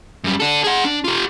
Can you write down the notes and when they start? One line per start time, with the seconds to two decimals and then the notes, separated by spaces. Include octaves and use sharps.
0.24 F#2 G3
0.40 D4 A4
0.64 G#4 F#5
0.85 D4
1.04 F4 G4